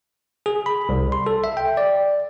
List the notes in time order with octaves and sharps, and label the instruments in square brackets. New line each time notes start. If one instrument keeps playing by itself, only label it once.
[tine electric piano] G#4
B5
C2
C6
A4
E5
G5
D5